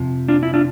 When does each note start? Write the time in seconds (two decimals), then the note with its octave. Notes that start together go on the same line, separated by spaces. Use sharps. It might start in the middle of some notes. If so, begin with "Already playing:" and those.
Already playing: F2 C3 F3
0.28 D4 F4
0.43 E4
0.54 D4 F4